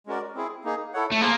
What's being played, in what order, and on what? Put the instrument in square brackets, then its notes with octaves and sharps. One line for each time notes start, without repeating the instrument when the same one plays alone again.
[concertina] G#3 C#4 F#4 A#4 D5
C4 E4 G#4
A#3 D#4 G#4
E4 A4 C#5 F#5
[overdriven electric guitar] A3
[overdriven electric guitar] A#3 [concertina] G#4 C5